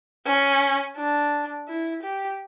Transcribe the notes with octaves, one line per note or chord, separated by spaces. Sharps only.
C#4
D4
E4
G4